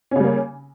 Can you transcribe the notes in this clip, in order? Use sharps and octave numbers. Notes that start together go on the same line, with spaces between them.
C#3 G3 A#3 C#4